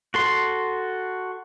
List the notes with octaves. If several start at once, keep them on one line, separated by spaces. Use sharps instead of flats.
F#4 A4 C6